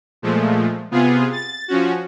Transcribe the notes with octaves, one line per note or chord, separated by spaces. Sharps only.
A#2 F3 G#3 A3
C3 B3 F4 G#4
A6
F3 C#4 F#4